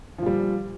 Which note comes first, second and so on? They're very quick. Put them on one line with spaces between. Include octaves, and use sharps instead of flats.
F3 A#2 G3